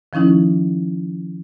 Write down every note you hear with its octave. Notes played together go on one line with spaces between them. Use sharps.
D#3 F3 C#4 D#4 E4